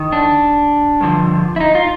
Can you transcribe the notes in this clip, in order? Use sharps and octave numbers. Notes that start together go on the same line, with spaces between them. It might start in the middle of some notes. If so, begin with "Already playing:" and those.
Already playing: D#3
D4
G2 D3 F3
E4
D#4
F4